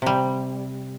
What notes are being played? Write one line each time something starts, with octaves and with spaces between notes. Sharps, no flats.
C3 G3